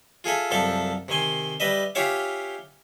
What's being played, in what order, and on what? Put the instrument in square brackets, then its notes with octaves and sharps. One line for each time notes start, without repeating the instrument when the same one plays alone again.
[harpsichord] F4 G#4 A4 E5
C2 F#2 F3 A4 E5 A5
C3 D#3 G#5 C6
G3 B4 D#5 E5
C#4 F4 G4 C#5 E5 F5